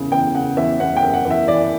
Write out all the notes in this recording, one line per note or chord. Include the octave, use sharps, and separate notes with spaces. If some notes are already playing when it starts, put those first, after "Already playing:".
Already playing: F#1 E2 C#3
E2 G5
C#3 F#5
E2 E5
E2 F#5
G5
F#1
F#5
E2
E5
E3 D5